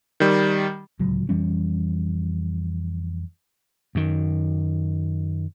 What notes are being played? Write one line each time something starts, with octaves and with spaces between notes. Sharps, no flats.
D#3 G3
D1 C#2 F#3
F2 E3 G3 C#4
F#2 D#3